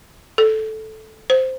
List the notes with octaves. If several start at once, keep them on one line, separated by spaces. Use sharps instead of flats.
A4
C5